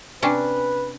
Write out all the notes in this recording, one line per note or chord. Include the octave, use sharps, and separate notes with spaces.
C3 C#4 D4 B4